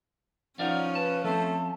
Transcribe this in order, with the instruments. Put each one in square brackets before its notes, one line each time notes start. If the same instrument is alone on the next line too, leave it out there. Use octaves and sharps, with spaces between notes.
[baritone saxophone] F3 [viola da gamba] C#4 [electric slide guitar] D#4 A#4 D5 [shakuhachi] F#5
[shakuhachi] B4 [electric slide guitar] A5
[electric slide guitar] F3 C4 [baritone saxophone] A3 [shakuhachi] A5